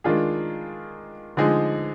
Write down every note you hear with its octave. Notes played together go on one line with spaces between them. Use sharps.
D#3 G#3 D4 F4 G#4
D3 F3 G#3 D#4 G#4